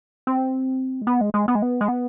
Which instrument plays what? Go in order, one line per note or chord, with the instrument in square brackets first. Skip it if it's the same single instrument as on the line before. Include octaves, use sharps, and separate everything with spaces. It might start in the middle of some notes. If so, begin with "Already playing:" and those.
[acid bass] C4
G#3
B3
G#3
G#3
B3
G#3
B3
G#3
B3